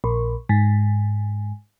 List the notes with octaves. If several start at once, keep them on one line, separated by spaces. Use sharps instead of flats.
A#1
G#2